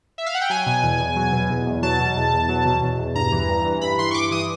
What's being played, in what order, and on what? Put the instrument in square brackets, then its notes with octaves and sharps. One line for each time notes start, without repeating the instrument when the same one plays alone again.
[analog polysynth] E5
F5
F#5
G5
F#3 G#5
B2
E2
E2
F#3
B2
E2
E2
F#3 A5
B2
E2
E2
F#3
B2
E2
E2
G2 A#5
E3
G2
E3
G2 B5
E3 C6
C#6
G2 D6
E3 D#6